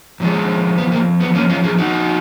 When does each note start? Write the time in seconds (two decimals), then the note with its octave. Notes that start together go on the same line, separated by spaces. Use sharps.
0.20 F2 F3 G#3
0.78 B3
0.92 A#3
1.21 B3
1.35 A#3 C#4
1.49 C#4 F4
1.64 F4 G#4
1.78 D#4 F#4